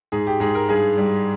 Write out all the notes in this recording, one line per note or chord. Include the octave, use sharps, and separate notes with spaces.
G#2 G#4
G4
G#2 G#4
A#4
G2 G#4
G3